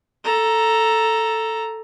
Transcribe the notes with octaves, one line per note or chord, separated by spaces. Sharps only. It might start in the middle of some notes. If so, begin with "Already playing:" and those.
A4 A#5